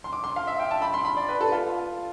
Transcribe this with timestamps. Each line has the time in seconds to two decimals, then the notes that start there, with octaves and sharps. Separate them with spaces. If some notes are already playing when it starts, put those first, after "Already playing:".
0.04 C6
0.13 D6
0.24 C6
0.36 F5
0.47 E5
0.59 G5
0.71 A5
0.82 B5
0.94 C6
1.05 B5
1.17 D5
1.29 B4
1.41 A4
1.52 F4